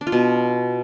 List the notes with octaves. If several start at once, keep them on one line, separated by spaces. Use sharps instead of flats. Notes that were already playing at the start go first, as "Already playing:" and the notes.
D4
F4
B2